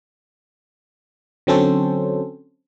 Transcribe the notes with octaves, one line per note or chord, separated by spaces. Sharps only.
D3 F#3 C4 C#4 A4 C5